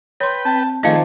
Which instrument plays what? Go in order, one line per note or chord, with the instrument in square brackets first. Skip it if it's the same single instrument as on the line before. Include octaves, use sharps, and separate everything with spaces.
[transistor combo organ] B4 G5 [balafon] C#5 C6
[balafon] C4 [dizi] A5
[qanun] D#3 F3 D5 [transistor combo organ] A3 G#4 [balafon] D#5 F5 [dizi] A5